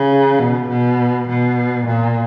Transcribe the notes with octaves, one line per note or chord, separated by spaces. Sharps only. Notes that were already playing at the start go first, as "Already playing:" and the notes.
Already playing: C#3
B2
B2
B2
A#2